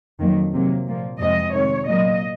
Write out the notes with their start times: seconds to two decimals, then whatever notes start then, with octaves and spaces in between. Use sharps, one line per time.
0.19 F2 D#3 F#3 A#3
0.53 C3 F#3 A#3
0.86 A#2 F3 A#3
1.19 F2 C3 F3 G#3 D#5
1.53 C3 D#3 G#3 C#5
1.87 A#2 F#3 A#3 D#5